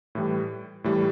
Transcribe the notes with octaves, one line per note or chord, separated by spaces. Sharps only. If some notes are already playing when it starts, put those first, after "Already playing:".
A2 E3 G3
A2 E3 G3